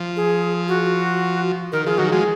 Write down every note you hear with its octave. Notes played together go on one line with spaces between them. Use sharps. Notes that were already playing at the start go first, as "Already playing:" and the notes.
Already playing: F3
G#4
F#4
D#3 A#4
F3 G#4
D#3 F#3 F#4
F3 G#3 G#4